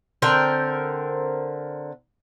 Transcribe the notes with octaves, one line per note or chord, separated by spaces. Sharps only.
D3 C4 A#4 G5